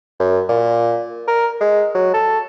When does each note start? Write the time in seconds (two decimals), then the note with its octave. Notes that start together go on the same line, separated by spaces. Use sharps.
0.20 F#2
0.49 A#2
1.28 A#4
1.61 G#3
1.95 F#3
2.14 A4